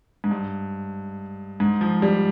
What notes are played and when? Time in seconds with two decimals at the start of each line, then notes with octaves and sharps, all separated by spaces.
0.24 G#2
0.31 G2
1.60 G#2
1.81 F3
2.02 G3